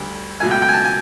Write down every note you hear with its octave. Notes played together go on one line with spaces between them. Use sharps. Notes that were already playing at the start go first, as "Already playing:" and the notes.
Already playing: D2 D3 G3
C#2 B2 F#3 A3 G#5
G5
G5
G#5
A5
G#5